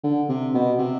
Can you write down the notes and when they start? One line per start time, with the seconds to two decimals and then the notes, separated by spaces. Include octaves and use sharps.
0.04 D3
0.29 C3
0.54 B2
0.79 C3